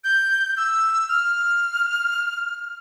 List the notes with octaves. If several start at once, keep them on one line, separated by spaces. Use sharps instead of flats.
G6
E6
F6